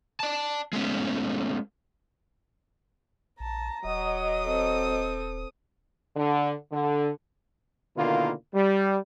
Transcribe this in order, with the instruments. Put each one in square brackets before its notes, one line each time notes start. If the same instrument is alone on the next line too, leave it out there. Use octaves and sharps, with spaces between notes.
[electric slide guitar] D5 A5
G#3 A3 B3 C#4
[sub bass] A#1 [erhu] A5 [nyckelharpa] A#5
[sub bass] D#1 [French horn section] F#3 D#5 [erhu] D#6
[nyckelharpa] C4 A4
[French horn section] D3
D3
[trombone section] B2 D3 D#3 A#3 E4 F4
G3